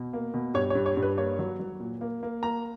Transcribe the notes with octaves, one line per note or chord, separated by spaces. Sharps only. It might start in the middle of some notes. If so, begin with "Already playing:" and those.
Already playing: B2
A#3
B2
G2 C#5
C#5
G2
C#5
G2
B4
A#3 C#5
F#3
F#3
A#2
A#3
A#3
A#3 A#5